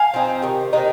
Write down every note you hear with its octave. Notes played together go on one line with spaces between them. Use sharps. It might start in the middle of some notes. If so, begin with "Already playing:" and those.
Already playing: F5 G#5
F3 C4 D#4
C3 D#3
C3 D#3 A#3 D#4